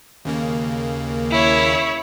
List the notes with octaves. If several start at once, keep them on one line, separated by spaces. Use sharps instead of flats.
D#2 C#3 A#3
E4 C#5